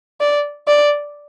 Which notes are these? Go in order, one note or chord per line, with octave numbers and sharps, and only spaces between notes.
D5
D5